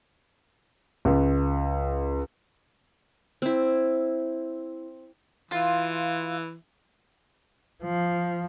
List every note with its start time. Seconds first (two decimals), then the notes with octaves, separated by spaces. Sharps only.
1.05 C#2
3.42 C4 E4
5.51 E3 F4
7.83 F3